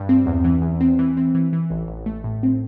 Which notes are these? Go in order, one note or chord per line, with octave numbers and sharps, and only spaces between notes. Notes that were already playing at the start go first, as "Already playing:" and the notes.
Already playing: G2
C4
E2
E3
E2
C4
E3
C4
E3
E3
A1
A1
A3
A2
C4